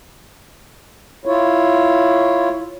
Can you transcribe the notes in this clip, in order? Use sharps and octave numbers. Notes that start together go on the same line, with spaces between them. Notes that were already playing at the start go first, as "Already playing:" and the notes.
E4 F4 C#5